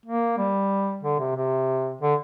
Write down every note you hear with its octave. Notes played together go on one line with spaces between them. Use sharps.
A#3
G3
D3
C3
C3
D3